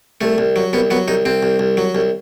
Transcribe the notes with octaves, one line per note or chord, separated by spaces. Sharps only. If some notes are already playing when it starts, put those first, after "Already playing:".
C2 A3
C2
F#3
C2 B3
F#3 B3
C2 D#4
C2 C4
C2
C2
F#3
C2